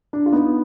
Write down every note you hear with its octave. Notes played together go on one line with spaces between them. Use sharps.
D4
F4
B3 D#4